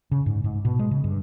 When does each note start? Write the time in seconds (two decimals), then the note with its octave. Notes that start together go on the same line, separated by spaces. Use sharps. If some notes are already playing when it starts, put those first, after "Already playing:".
0.11 C#3
0.26 G#2
0.44 G#2
0.65 B2
0.79 G#3
0.91 C#3
1.04 G2